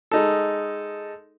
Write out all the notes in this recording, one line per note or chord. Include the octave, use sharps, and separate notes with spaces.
G#3 D#4 A4